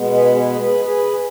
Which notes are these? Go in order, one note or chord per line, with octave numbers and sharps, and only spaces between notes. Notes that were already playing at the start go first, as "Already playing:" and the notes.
Already playing: B2 G#3 B3
G#4 B4
G#4 B4
G#4 B4
G#4 B4